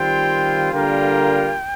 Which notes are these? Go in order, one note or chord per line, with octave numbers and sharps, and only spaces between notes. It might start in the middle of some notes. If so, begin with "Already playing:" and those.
Already playing: D#3 G3 C4 F4 G5
D3 G3 A#3 F4 A#4 G5